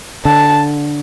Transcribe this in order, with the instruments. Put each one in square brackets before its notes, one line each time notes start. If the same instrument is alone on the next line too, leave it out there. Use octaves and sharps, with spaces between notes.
[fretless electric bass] D3 [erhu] A5